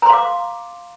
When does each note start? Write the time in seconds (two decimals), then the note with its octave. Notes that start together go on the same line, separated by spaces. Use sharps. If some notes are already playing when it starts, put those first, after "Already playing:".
0.02 A#5
0.06 C6
0.10 F5
0.13 D6